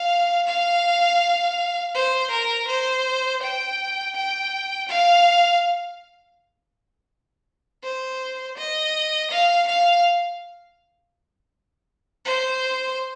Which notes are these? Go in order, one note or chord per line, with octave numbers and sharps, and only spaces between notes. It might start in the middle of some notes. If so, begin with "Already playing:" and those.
Already playing: F5
F5
C5
A#4
C5
G5
G5
F5
C5
D#5
F5
F5
C5